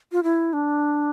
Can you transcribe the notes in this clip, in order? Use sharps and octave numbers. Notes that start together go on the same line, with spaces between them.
F4
E4
D4